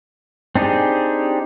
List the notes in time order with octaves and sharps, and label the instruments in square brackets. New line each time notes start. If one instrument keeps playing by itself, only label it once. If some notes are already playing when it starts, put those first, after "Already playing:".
[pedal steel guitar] C4 D4 D#4 G4 G#4